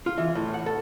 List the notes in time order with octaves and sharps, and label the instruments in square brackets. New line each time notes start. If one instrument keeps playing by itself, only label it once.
[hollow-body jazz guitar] F4
E3
A2
F#5
A4